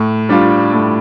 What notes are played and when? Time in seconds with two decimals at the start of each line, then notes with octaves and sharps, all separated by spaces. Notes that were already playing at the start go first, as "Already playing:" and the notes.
Already playing: A2
0.29 G3 D4 F4
0.73 A2